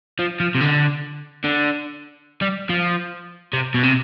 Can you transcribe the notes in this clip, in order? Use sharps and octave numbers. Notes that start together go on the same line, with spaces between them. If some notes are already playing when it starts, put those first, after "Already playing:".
F3
F3
C3
D3
D3
G3
F3
C3
B2
C3